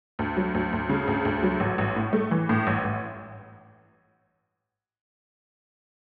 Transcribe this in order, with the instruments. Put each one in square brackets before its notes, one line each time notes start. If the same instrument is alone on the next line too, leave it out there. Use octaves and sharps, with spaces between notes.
[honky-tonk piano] D2
F#3
D2
D2
C#3
D2
D2
F#3
A1
A1
A2
A3
E3
A2
A1
A1